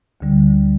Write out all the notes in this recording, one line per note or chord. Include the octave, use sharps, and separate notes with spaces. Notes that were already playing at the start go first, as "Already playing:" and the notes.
D2 D3 G3